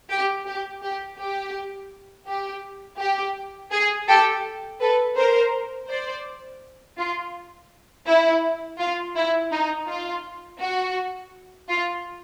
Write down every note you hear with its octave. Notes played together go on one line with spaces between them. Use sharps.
G4
G4
G4
G4
G4
G4
G#4
G4 A4
A4 B4
A#4 C5
C5 D5
F4
E4
F4
E4
D#4
F4
F#4
F4